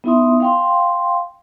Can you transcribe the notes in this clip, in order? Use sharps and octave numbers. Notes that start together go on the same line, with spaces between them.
B3 D#4 E4 E5 C6 D#6
F5 G5 C6